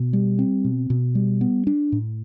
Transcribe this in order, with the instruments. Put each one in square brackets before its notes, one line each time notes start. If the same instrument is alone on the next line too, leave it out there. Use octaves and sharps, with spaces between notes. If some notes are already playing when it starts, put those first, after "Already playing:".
Already playing: [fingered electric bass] B2
G3
C4
B2
B2
G3
B3
D4
A2